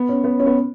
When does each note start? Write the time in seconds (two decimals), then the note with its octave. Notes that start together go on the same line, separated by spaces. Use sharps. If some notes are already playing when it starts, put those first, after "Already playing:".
Already playing: B3
0.09 C#4
0.24 B3
0.40 C#4
0.46 B3